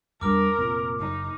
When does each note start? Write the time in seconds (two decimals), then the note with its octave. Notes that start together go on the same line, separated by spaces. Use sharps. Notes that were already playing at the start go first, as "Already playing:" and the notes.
0.21 E2 G3 D4 A#4 D6 F6
0.58 F1 A#2 C4
1.00 F#1 D#4